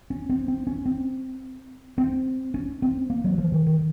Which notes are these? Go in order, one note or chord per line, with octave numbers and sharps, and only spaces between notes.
C#4
C4
C4
C#4
C4
C4
C#4
C4
A#3
F#3
F3
D#3
D#3